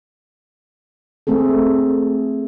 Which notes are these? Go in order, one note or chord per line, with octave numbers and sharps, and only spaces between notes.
A3 C4 G#4 A4